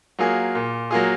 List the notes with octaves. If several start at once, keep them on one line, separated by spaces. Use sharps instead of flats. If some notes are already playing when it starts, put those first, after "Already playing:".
F#3 A#3 F4 G#4
A#2
F#3 A#3 F4 G#4